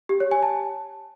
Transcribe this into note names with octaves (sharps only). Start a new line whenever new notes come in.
G4
C#5
G#5
A5